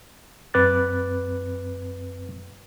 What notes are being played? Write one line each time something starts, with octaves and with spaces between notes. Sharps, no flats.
F#2 C4 B4 D6 F#6 A6